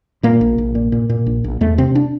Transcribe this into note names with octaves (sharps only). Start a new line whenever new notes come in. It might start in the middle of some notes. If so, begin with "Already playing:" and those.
A#2 A#3
A#1
A#1
A#2
A#2
A#2
A#1
A#1
E2 A3
C3 C4
D4